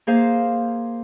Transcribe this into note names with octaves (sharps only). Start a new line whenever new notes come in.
A#3 G#4 C5 F5